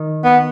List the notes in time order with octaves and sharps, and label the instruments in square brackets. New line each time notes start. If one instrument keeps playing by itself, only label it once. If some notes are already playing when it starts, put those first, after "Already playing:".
Already playing: [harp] D#3
[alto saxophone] B3